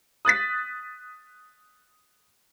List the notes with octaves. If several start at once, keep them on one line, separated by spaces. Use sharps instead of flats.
D#6 F#6 A6 B6